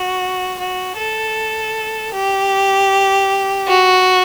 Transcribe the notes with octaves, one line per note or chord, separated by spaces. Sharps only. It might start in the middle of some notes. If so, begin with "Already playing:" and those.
Already playing: F#4
F#4
A4
G4
F#4